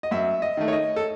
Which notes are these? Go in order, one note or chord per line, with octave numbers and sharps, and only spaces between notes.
D#5
F#2 E5
D#5
D#3 A3
C#5
D#5
A4